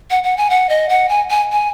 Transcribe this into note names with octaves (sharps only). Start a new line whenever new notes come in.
F#5
F#5
G#5
F#5
D#5
F#5
G#5
G#5
G#5